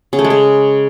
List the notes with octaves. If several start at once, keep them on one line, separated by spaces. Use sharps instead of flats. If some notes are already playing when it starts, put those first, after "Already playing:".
C#3
A3
G#3
C#3